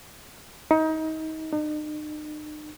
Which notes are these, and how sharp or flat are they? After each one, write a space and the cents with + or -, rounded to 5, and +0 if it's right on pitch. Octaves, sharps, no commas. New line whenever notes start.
D#4 +30
D#4 -40